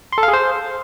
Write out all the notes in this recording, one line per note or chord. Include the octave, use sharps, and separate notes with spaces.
C6
A4
F5
G#4
C5